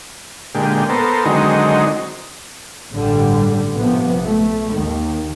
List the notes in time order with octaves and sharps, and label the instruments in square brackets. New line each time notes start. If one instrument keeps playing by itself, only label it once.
[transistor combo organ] A#2 D3 G#3 G4
B3 A4 A#4 C5
D3 D#3 F#3 G#3 C4 D#4
[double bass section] A1 G2 D3 G3
A#1 C3 F3 B3
A3
D#2 D#3